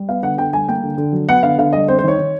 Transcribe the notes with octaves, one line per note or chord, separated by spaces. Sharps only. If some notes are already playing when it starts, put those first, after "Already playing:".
Already playing: G3
B3 F5
D3 F#5
D3 G5
G3 G#5
A#3 G5
D3
D3
F#3
B3 F#5
D3 F5
D3 F5
G3 D#5
C4 C5
C5
D#3 C#5
D#3